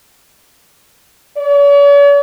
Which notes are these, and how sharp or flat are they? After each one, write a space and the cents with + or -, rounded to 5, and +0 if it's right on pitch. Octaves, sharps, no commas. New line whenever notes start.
C#5 +45